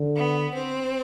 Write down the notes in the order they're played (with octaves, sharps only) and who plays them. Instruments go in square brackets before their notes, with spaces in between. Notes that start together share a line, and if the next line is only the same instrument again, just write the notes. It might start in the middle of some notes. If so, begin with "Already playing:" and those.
Already playing: [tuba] D3
[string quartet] B3
C4